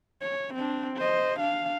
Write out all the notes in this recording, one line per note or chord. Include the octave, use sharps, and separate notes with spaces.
C#5
C4 D4
C5 D#5
D4 F5